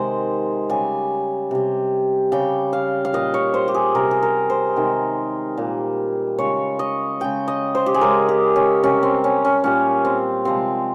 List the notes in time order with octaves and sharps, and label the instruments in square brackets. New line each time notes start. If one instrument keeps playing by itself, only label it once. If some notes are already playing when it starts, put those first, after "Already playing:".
Already playing: [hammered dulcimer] C3 D#3 G#3 C5
C#3 G3 G#5
C3 G3
C#3 G3 G5
F5
F5
A#2 G3 D#5
C#5
C5
G4
G#4
C3 G3 A#4
G#4
A#4
C5
C3 D#3 G#3
A#2 G3
C#3 G#3 C#5
D#5
C#3 G#3 G5
D#5
C5
G4
G#4
C#3 G#3 A#4
G4
C#4
C3 G3 C#4
C4
C#4
C#4
A#2 G3 C#4
C4
C3 F3 G#3 C4